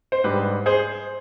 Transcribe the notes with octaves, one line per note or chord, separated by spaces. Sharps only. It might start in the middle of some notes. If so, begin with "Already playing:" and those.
C5
G#2 G3 D4 G4 B4
G#4 C5